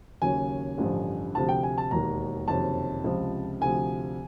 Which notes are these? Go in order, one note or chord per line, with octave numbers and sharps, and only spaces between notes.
D#2 C#3 F#3 G#5
A1 G2 D3 F3
D2 C3 F3 A5
G5
G#5
A5
E1 D#2 D#3 A#5
F#1 F2 C3 D#3 F#3 A5
C#2 C3 F3
D2 C3 F3 G#5